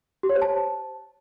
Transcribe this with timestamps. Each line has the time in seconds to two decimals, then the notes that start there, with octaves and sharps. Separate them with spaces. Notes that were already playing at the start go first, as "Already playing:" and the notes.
0.23 G4
0.29 C#5
0.36 C5
0.42 A5